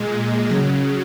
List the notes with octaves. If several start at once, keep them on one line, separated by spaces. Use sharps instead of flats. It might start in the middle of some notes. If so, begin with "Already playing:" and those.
Already playing: A#2 G#3
C#3 F#3